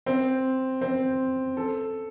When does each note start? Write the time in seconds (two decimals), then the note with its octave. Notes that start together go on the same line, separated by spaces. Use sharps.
0.06 C4
0.81 C4
1.57 A4